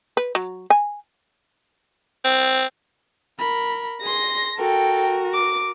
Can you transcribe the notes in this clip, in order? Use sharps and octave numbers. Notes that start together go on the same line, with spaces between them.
B4
F#3
G#5
C4
A#4 B5
G#4 C6 A#6
F#4 A4 A#4 G5
D6